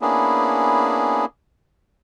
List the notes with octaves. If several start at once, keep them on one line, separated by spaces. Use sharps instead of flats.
A#3 B3 C#4 D4 E4 G#4